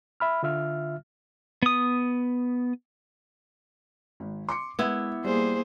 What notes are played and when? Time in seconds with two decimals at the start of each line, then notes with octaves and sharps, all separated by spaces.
0.20 E5 B5 F6
0.43 D3 F4 E5 F6
1.63 B3 D#6
4.20 G#1
4.49 C6 D6 C#7
4.79 G#3 B3 E4 E5 G#6
5.25 G3 A#3 G#4 C5